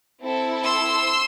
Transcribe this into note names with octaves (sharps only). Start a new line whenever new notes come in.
C4 E4 A4
C6 E6